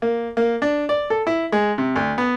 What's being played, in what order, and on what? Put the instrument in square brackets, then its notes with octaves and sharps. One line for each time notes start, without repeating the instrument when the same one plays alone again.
[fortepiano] A#3
A#3
D4
D5
A4
E4
G#3
C3
D2
B3